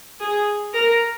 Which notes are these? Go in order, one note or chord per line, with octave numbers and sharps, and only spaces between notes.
G#4
A#4